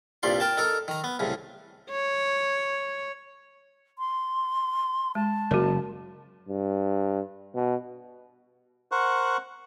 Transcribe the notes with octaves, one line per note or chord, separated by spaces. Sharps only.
C2 G2 A#2 D5 C6
A#4 G5 A5
D#4 A4 A#4
D#3 A#5
B3
C2 A2 C#3
C#5
C6
G#3 A5
F#1 F#4 G#4 A#4
G2
B2
A#4 C5 F#5 C#6 F#6